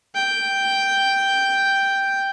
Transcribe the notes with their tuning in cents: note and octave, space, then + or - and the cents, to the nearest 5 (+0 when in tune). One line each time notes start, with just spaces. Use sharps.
G5 +0